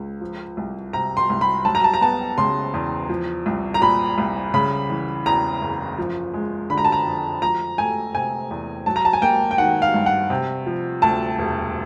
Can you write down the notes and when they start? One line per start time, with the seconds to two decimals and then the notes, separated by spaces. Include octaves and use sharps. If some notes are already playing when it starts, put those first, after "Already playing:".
Already playing: C#2
0.21 F3
0.57 C2
0.93 C3 A#5
1.17 C6
1.30 C2
1.41 B5
1.65 F#3 A5
1.75 A#5
1.84 A5
1.94 A#5
2.01 B3 A5
2.38 C#3 C6
2.74 E2
3.09 F3
3.46 C2
3.74 A#5
3.82 A#2 B5
4.18 C2
4.54 C#3 B5
4.89 E3
5.26 E2 A#5
5.61 F#1
5.98 F3
6.34 G#3
6.70 D3 B5
6.78 A#5
6.85 A5
6.92 A#5
7.06 F2
7.42 F3 A#5
7.78 A3 G#5
8.14 C3 G#5
8.51 E2
8.86 F#3 A5
8.96 A#5
9.05 A5
9.13 G#5
9.22 A#3 G5
9.51 G5
9.58 D#3 F#5
9.82 F5
9.94 G2
10.06 F#5
10.30 C3
10.66 F3
11.02 D2 A5
11.39 E1